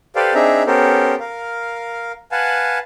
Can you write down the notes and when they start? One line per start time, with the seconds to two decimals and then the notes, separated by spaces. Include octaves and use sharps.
0.16 G4 A4 B4 C5 D5 F5
0.35 C4 D4 D#4 G#4 E5 A#5
0.66 B3 C#4 G4 A4 A#4 C5
1.20 A#4 F5
2.32 B4 F5 F#5 G#5 A5